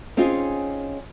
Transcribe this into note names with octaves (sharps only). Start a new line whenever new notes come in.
C4 C#4 D#4 F4 G#4